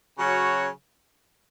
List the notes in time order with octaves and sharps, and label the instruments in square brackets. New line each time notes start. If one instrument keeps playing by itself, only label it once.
[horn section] C#3 F#3 C#4 F#4 C#5